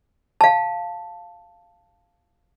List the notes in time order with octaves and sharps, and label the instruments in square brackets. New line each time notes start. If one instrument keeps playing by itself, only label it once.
[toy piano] F5 A5